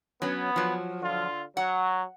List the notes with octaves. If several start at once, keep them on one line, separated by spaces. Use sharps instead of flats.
F#3 B3 C#4
F3 F#3
D3 F4
F#3 F#5